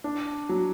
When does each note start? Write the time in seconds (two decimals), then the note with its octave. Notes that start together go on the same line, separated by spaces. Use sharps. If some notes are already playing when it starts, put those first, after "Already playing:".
0.04 D4
0.49 F#3